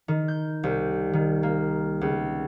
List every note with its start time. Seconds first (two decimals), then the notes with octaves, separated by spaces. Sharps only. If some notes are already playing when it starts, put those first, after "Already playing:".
0.08 D#3
0.28 G6
0.63 C2
1.13 D#3
1.43 A#3
2.01 C#2